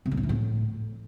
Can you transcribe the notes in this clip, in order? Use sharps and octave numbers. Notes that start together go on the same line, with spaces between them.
C3
A2
C3
E3
A2